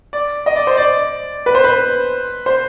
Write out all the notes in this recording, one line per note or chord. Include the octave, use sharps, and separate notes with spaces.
D5
D#5
D5
C5
D5
B4
C5
B4
C5